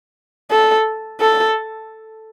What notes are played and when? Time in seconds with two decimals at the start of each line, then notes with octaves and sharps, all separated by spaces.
0.51 A4
1.20 A4